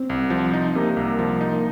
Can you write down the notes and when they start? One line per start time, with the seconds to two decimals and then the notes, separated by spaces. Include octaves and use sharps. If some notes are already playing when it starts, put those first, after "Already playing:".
Already playing: C4
0.10 C2
0.30 F3
0.53 D#4
0.75 C3 A#3
0.97 C2
1.19 F3
1.41 D#4
1.52 A#3